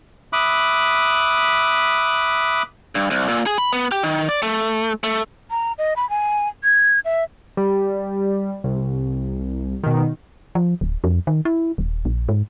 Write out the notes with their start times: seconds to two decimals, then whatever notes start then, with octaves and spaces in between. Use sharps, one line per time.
0.33 E5 B5 D6 D#6 F#6
2.95 G2
3.10 C2
3.29 A#2
3.47 G#4
3.58 B5
3.73 B3
3.92 G4
4.03 D#3
4.29 D5
4.43 A3
5.04 A3
5.51 A#5
5.78 D#5
5.96 B5
6.10 G#5
6.64 G#6
7.05 E5
7.57 G3
8.64 C2
9.83 B2 D#3
10.55 F3
10.81 D1
11.04 F2
11.27 D#3
11.45 E4
11.78 D#1
12.05 A#1
12.29 G#2